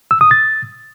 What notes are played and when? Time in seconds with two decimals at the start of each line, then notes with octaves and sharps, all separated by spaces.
0.11 E6
0.21 D#6
0.31 A6